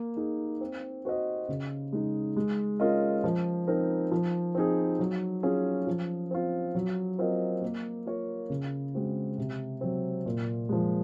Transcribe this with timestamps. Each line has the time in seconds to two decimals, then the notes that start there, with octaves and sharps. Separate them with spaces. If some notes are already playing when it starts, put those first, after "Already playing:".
Already playing: A#3
0.17 D#4 G#4
0.61 C4
1.05 F#4 C5 D#5
1.49 C#3
1.93 G#3 D#4
2.36 G#3
2.80 C#4 F4 A#4 D#5
3.24 F3
3.67 C4 D#4 A#4
4.12 F3
4.55 C4 D#4 G#4
4.99 F#3
5.43 C#4 F4 G#4
5.87 F3
6.31 C4 F4
6.75 F#3
7.19 C4 F4 A#4 D#5
7.62 A#3
8.06 F4 A#4 C#5
8.50 C#3
8.94 G#3 C4 F#4
9.38 C3
9.81 F#3 C4
10.26 A#2
10.69 F3 G#3